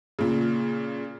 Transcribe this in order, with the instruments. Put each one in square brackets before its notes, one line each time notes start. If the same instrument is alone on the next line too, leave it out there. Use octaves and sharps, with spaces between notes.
[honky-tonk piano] A#2 C#3